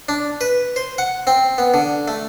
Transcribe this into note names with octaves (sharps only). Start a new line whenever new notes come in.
D4
B4
C5
F#5
C4
B3
D3
A3